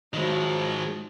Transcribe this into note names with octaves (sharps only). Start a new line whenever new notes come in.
D#3 F3 F#3 G#3